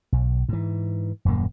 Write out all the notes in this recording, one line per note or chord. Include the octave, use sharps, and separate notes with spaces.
B1
G#2 E3
D#1 F#2 A2 A#3